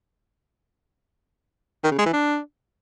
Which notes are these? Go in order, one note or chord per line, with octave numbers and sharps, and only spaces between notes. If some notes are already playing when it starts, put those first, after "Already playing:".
D#3
C#3
G#3
E3
D4